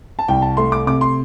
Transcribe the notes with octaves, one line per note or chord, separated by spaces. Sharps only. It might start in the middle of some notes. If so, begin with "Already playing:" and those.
A5
C2 G5
A5
A3 C6
D6
C3 D6
C6